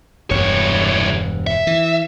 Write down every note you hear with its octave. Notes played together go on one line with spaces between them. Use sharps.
E1 C2 G2 C#5
E5
E3